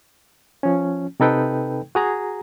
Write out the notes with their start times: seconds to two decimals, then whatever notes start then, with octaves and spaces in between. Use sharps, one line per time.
0.63 F3 C#4
1.20 C3 C4 D#4 A4 B4 G5
1.95 F#4 G#4 A#5